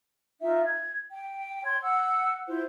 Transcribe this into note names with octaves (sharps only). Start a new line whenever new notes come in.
D#4 F4 E5
G#6
G5
C#5 C6 G#6
F#5 E6
E4 F4 C5